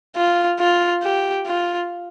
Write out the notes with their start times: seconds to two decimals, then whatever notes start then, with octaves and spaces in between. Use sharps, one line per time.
0.16 F4
0.60 F4
1.03 G4
1.47 F4